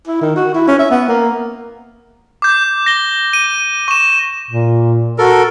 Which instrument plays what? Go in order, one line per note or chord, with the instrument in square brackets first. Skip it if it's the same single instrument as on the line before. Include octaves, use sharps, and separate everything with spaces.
[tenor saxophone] E4
D#3
F#4
E4
C#4
E5
B3
A#3
[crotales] D6 G6
A#6 G7
D#7
C#6 E7
[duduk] A#2
[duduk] F#4 [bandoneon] A4 A#4